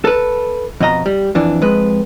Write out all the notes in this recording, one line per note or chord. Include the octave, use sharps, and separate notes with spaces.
A4 B4
F2 B2 D#5 A#5
G3
F2 E3 D4
F2 G#3 B4